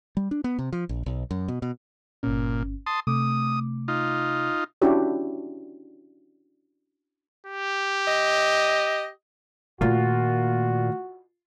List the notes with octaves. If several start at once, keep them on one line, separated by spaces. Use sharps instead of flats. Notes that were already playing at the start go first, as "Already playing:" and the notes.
G3
D4
B3
C3
F3
A#1
B1
F#2
B2
B2
G1 A#2 C#4
A5 C6 D#6
C3 A3 D6 D#6
D#4 F4
C#4 D4 E4 F#4 G4 C#5
G4
D#5
A#2 D#3 A3 F4 F#4